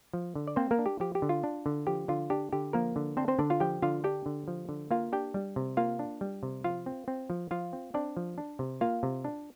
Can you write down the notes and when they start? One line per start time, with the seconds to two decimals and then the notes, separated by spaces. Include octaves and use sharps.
0.13 F3
0.35 D3
0.47 D5
0.56 A#3 C4 C5
0.71 A#3 A#4
0.79 D4
0.86 G4
1.00 F3 G4
1.15 G4
1.22 D3
1.29 F4
1.44 D4
1.66 D3
1.87 F3 G4
2.08 D3 F4
2.30 D4 G4
2.52 D3 G4
2.73 F3 A#3 A#4
2.96 D3
3.17 C4 D4 C5
3.28 C4 C5
3.39 D3 D4 D5
3.50 F4 F5
3.60 F3 G4 G5
3.82 D3 F4 F5
4.04 D4 G4 G5
4.26 D3
4.48 F3
4.69 D3
4.91 A#3 F4 F5
5.12 D4 G4 G5
5.34 G3
5.56 C3
5.77 A#3 F4 F5
5.99 D4
6.21 G3
6.43 C3
6.64 F3 F4 F5
6.86 C4
7.08 C4
7.30 F3
7.51 F3 F4 F5
7.73 C4
7.94 C4 D4 D5
8.17 F3
8.38 D4
8.59 C3
8.81 A#3 F4 F5
9.03 C3
9.25 D4